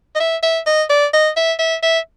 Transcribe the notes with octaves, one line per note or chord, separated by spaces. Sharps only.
D#5
E5
E5
D#5
D5
D#5
E5
E5
E5